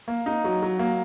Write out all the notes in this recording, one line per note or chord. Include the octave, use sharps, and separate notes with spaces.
A#3
D#4
F#3
F#3
A#3